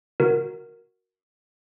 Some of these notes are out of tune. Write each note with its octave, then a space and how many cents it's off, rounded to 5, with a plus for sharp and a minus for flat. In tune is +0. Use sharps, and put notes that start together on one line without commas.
F#4 -5 A#4 +0